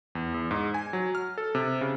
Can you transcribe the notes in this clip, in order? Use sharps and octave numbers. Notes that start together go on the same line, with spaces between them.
E2
E2
G#2
G#5
F#3
F6
A4
C3
C#3